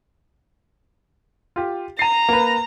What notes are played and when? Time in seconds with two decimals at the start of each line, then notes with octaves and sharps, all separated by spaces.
1.56 F4 G4
1.99 A#5 C7 D#7
2.29 A#3 B4